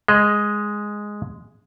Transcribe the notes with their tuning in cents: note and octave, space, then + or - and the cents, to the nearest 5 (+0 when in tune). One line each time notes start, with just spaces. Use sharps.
G#3 +0 D#5 +0